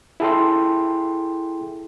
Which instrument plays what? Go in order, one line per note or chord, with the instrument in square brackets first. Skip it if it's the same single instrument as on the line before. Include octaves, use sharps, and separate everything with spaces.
[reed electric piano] E4 G#4 A4 G5 C6